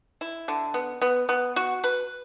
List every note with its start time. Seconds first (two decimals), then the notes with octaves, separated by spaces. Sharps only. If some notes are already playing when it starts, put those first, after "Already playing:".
0.21 E4
0.48 D3
0.74 B3
1.02 B3
1.29 B3
1.56 F#4
1.84 B4